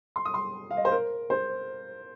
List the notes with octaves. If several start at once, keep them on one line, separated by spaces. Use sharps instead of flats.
C6
D#6
C6
F5
D#5
C5
A#4
C5